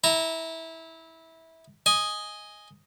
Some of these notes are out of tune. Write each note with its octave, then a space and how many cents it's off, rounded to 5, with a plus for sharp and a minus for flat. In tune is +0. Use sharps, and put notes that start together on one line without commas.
E4 -20 A#5 +0
D#5 +0 G#5 +0